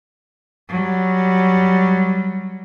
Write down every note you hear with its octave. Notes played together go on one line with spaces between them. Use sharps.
F#3 G3